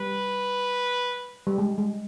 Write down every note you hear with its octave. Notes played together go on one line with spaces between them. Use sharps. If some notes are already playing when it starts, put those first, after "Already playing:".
Already playing: G3 B4
G3
G#3
G#3